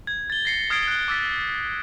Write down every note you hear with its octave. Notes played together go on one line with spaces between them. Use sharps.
G#6
A6 G7
A#6 C7 C#7
D#6 F6 G#6 A6 C7 D7
F#6 D7
D6 E6 A6 B6